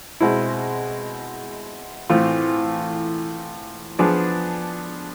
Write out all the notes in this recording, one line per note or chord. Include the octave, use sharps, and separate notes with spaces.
B2 G#3 C4 E4
A2 E3 A3 C4 F4
F3 B3 D4 G#4 D5